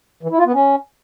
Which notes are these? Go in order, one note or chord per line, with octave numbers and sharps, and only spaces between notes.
E3
E4
F4
B3
C#4